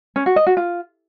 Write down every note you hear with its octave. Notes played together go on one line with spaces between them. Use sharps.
C#4
F#4
D#5
F#4
F4